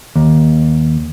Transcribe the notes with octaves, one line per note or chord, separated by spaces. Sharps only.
D#2